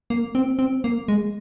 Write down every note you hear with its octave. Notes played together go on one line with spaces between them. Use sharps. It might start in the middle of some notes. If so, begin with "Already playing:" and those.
A#3
C4
C4
A#3
G#3